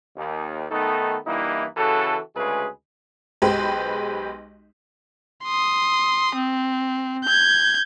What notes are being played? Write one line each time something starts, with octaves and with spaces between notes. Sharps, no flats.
D#2
D#3 A3 B3 D#4 A4
G2 E3 A#3 D#4 E4
C#3 E3 F#4 A4
D2 C#3 G#3 G#4 B4
B1 G#3 G4 B4 C5 G5
C6 D#6
C4
G6 G#6